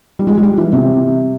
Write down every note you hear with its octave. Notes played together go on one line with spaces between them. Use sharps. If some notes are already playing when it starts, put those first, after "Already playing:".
G3
G#3
G#3
G3
E3
C3